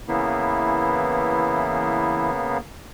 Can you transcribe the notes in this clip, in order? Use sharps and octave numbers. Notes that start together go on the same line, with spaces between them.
C#3 E3 A#3 B3 E4